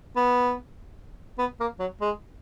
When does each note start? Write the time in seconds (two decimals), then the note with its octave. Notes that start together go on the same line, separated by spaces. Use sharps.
0.16 B3
1.38 B3
1.60 A#3
1.79 F#3
2.01 G#3